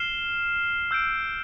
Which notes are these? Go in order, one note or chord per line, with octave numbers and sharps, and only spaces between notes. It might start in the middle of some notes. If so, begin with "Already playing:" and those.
Already playing: F6 C7 E7 G7
E6 G6 D7